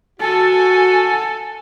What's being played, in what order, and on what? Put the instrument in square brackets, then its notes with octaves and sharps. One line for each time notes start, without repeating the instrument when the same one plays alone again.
[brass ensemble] F#4 [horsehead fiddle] A4 [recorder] G#5